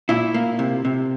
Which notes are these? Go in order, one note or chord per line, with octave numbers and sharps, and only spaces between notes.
A#2 E4
A#3
C3
C3